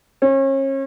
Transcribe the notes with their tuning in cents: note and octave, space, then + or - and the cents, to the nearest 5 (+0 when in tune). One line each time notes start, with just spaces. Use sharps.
C#4 -35